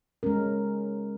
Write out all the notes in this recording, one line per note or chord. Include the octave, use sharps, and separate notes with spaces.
G#3 C#4 A#4